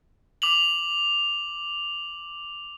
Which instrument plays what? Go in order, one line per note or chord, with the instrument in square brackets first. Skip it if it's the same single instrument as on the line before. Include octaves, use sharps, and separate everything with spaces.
[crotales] D6 F7 F#7